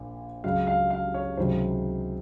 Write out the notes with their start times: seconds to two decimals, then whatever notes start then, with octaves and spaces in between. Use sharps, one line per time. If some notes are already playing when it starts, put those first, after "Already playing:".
Already playing: A#1 A#2 F3
0.44 C#2 C#3 F#3 F5
0.67 F5
0.91 F5
1.14 C#5
1.37 C#2 C3 D#3 F#3 C5